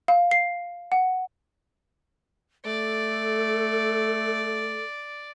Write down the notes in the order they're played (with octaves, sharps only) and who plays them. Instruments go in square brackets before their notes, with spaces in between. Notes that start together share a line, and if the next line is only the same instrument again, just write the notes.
[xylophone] F5
C7
F#5
[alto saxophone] A3 [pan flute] A4 [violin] D5